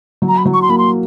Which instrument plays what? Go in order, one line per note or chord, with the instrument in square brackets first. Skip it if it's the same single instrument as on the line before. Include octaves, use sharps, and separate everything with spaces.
[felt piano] F#3
[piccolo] A#5
B5
[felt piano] F#3
[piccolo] C#6
C6
[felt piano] A#3 [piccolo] B5
[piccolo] C6